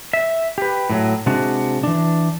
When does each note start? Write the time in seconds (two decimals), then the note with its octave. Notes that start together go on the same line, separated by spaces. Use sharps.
0.13 E5
0.58 G4 B4
0.90 A2 F#3
1.26 C3 G#3 D4 F#4
1.83 E3 D4